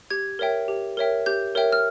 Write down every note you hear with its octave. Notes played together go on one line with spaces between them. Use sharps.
G4 G#6
A#4 C#5 E5 G5
G4
A#4 C#5 E5 G5
G4 G6
A#4 C#5 E5 G5
F6